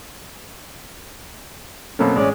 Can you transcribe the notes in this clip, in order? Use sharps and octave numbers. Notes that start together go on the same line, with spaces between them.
B2 F#3 A3 A#3 C4 C#4
A1 G#3 C#4 D5